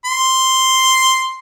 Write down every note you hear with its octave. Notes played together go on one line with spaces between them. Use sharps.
C6